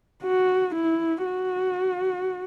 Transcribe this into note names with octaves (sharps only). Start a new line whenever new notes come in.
F#4
E4
F#4